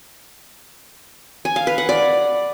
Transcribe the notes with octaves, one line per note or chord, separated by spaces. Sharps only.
G#5
F5
B4
F#5
D5